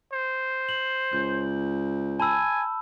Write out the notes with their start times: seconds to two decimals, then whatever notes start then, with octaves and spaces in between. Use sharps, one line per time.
0.13 C5
0.69 F#7
1.13 C#2 G6
2.20 G#5 A5 B5 E6